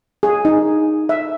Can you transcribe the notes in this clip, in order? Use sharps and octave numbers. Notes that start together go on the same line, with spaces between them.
G#4
D#4
E5